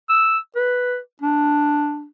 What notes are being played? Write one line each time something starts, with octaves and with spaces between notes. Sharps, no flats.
E6
B4
D4